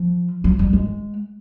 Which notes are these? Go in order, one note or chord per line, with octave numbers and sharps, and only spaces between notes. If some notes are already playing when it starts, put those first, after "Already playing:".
Already playing: F3
F#3
G3
G#3